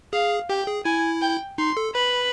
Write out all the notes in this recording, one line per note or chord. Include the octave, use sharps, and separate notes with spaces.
G#4 F5
G4 G5
G#4
E4 G#5
G5
D#4 C6
A4
B4 B5